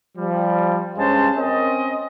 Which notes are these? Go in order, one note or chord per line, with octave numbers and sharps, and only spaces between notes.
F3 G3
G2 G#3 C#4 C5 A5
C4 C#4 A#4 D#5